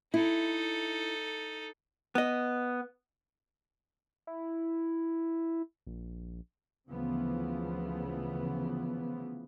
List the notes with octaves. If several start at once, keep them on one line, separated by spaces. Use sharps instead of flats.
D#4 E4 A4
B3 D#5
E4
A#1
D2 C#3 E3 F3 B3